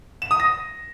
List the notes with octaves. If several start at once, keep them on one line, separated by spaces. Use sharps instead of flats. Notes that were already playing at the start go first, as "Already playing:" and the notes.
E7
D#6
A#6